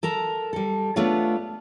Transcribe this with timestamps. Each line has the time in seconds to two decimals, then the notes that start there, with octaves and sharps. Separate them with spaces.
0.03 A4 A#4 A#5
0.53 G3 A4
0.96 A3 B3 D4 F4 C#5